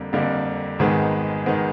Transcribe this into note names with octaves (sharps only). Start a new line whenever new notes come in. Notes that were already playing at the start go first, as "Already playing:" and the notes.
Already playing: F2 D3 G3 A#3
F2 D3 G3 A#3
G#1 G#2 D#3 G#3 B3
D#3 G#3 B3